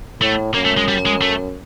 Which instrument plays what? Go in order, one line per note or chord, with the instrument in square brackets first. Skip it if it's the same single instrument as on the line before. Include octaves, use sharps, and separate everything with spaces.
[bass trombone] A2 [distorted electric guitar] A3
[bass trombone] F#2 [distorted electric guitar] A#3
[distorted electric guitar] A3
G#3
G3
G#3
A3